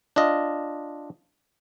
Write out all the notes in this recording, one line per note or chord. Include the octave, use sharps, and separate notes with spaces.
D4 F4 D#5